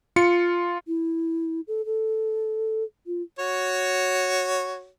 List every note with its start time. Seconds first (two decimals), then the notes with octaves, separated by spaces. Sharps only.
0.16 F4 C#7
0.87 E4
1.68 A4
1.85 A4
3.07 F4
3.39 F#4 C#5